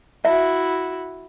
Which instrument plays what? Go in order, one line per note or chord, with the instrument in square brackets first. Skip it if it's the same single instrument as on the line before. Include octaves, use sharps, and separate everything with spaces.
[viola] E4 F#4 [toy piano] E5